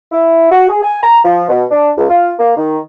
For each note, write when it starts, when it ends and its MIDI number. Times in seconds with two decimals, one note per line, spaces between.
0.12 0.47 64
0.50 0.67 66
0.68 0.79 68
0.82 1.01 80
1.03 1.19 82
1.24 1.43 53
1.48 1.64 47
1.70 1.90 62
1.97 2.05 37
2.09 2.32 65
2.39 2.53 58
2.56 2.78 51